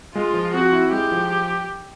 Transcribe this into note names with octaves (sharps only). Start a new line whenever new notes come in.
G#3 F4
F3
C4 F#4
E4
G#3 G4
F3